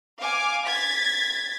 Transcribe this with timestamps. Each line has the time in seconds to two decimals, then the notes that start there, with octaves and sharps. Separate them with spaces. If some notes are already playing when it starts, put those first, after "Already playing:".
0.20 F5 G#5 D6
0.66 G#6 A6 B6